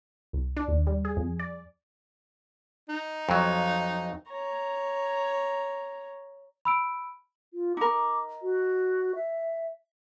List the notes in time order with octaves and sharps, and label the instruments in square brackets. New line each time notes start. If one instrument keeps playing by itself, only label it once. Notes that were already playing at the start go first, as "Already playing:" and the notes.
[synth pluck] C2
D4
D#2
G3
G#4
F2
D5
[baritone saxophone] D#4
[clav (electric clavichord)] F2 F#3
[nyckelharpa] C#5 A#5
[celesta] B5 E6 D7
[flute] F4
[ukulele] D#4 A#4 [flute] D6
[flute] F#4
E5